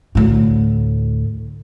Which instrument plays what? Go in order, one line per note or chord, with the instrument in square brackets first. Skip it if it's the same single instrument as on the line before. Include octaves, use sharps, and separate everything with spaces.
[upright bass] D2 A2